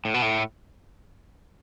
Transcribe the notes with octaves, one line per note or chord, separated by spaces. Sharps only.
A2
B2
A2